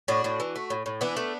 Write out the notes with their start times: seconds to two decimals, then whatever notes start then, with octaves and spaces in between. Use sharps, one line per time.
0.08 A2 D4 F#4
0.24 A2
0.40 E3
0.56 A3
0.70 A2
0.86 A2
1.01 E3 B3 D4
1.16 A3